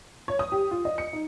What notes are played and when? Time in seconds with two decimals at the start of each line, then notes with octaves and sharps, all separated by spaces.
0.28 C#5
0.39 D#6
0.52 G4
0.71 F4
0.85 D#5
0.98 C#7
1.13 D#4